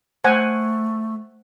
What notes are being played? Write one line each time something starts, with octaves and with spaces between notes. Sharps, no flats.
A3 C5 F#5 G#5